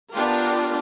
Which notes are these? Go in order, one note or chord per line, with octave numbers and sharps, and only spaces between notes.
B3 D4 F4 G4 A#4